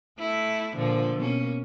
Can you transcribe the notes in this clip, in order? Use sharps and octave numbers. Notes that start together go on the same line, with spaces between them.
A3 E4
A#2 D3 F3
B2 A#3 C#4